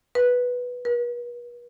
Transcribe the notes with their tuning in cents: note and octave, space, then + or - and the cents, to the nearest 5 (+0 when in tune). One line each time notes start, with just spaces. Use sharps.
B4 -5
B4 -45